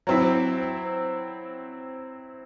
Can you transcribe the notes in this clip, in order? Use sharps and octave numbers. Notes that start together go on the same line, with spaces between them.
F#3 C4 E4